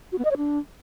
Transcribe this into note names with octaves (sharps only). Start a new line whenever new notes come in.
F#4
B3
D#5
C#5
D4